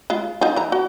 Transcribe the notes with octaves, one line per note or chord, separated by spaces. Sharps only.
G#3 F4
D#4 F4
E3 A#5
F#4